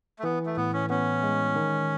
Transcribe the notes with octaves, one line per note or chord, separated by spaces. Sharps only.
A3
E3 B3
A3
A2 B3
C#4
B3 C#4
G#3
D#3